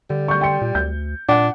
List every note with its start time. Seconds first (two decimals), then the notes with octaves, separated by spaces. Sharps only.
0.10 D3 G3
0.28 C#6 G6
0.41 G5 C6 C#7
0.62 A#2
0.75 D2 G6
1.29 A#2 D4 F#5